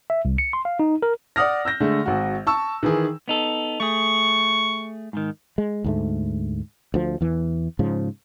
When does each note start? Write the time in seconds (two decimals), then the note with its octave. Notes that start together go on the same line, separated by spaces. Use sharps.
0.10 E5
0.25 C2
0.38 C#7
0.53 C6
0.65 F5
0.79 D#4
1.02 A#4
1.36 D5 F#5 D#6 F6 A#6
1.65 E6 G6 A#6
1.80 D3 G#3 A3
2.06 G#1 F#4
2.47 A5 C#6 E6
2.83 D#3 E3 G#4
3.28 B3 D#4 A4
3.80 A3 G#4 C#6
5.13 G#2 D#3
5.58 G#3
5.84 D2 G#2 A3
6.94 D2 F3
7.21 E2 E3
7.79 G#2 C#3 F3